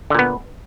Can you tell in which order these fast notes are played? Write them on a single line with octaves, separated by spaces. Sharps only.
D3 A#2 B3